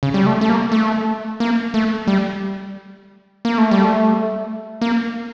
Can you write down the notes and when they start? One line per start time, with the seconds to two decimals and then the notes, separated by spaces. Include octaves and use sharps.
0.03 C#3
0.14 G3
0.26 A3
0.41 A3
0.49 A#3
0.72 A3
1.40 A#3
1.74 A3
2.07 G3
3.45 A#3
3.58 A3
3.71 G3
3.85 A3
4.81 A#3